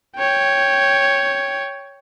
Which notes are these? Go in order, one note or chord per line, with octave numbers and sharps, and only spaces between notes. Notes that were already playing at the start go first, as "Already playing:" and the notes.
C#5 G5